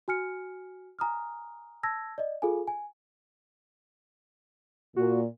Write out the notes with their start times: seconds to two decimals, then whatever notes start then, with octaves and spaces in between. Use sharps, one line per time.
0.08 F#4 G#5 F6 C#7
0.99 G#5 A#5 D#6 F6
1.83 A5 E6 G#6 A#6
2.18 D5 D#5
2.42 F4 G#4 A4 F5 G#5
2.67 G#5
4.96 A#2 F#4